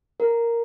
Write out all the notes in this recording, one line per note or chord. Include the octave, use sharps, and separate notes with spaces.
A#4